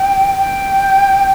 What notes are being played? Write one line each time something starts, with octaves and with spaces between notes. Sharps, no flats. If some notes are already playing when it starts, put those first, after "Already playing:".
Already playing: G5
G5